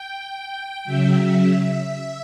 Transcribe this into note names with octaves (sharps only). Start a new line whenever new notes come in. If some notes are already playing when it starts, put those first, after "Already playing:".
Already playing: G5
C#3 F#3 E5